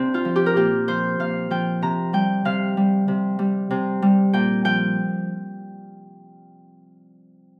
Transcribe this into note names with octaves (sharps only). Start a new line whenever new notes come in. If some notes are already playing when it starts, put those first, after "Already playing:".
Already playing: C3 C4 D4
F4
F3
G4
A#4
A#2 G4
F3 C5
A#2 F5
F3 G5
C3 A#5
G3 G5
C3 F5
G3
C3
G3
C3
G3
A#2 G5
F3 G5